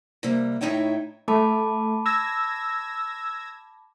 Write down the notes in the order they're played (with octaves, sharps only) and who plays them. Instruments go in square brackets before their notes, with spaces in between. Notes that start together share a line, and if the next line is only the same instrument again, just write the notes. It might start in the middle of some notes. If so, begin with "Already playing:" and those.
[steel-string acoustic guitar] C3 G3 A#3
A2 D#4 E4 C#5 G5
[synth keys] A3 [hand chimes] A5 B5 D6
[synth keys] E6 G#6 A#6